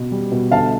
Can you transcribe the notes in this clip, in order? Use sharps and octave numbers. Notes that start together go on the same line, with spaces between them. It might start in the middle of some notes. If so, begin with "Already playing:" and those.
Already playing: B2 B3
G3
B2
D3 F5 A5